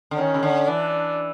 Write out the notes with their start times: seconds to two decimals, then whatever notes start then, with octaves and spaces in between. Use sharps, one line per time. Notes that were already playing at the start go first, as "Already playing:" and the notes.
0.11 D3
0.18 D#3 C#4
0.34 C#3
0.43 D3
0.67 E3 D4